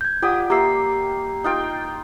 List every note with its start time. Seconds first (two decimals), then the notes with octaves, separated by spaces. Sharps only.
0.01 G6 G#6
0.22 F4 G4 D5 F#5 D#6
0.50 A#3 G4 E5 A#5 E6 C7
1.44 D#4 F4 G5